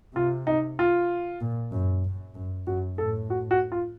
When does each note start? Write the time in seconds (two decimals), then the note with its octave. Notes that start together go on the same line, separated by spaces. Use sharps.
0.15 C3 F4
0.47 D#4
0.79 F4
1.41 A#2
1.72 F#2
2.05 F#2
2.35 F#2
2.67 F#2 F#4
2.98 A2 A4
3.30 F#4
3.51 F#4
3.72 F4